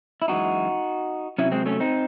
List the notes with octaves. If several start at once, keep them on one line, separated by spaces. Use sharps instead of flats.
E4
F#2 E3 G#3 D#4 F#4
C3 F#3 C#4 E4
G#3 C4
A3 C#4
C4 D#4